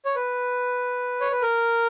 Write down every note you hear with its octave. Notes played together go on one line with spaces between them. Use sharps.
C#5
B4
C#5
B4
A#4